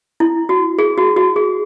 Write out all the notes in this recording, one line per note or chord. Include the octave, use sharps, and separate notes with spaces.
E4
F#4
G#4
F#4
F#4
G#4